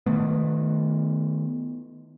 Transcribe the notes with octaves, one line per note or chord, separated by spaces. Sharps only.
D#3 A3 B3